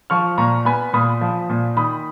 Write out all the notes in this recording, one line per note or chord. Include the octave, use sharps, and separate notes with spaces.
F3 C#6 F6
A#2 A#5 C#6
B3 G#5 B5
A#2 B5 D#6
F3
A#2
D#3 B5 D#6